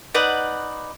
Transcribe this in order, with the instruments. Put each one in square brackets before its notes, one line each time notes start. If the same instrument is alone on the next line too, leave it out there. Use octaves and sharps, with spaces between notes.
[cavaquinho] D#4 B4 D5 F#5